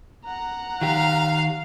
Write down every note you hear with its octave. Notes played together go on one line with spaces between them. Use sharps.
F#5 A#5
D#3 G4 F5